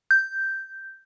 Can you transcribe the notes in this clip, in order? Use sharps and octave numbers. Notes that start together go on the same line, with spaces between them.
G6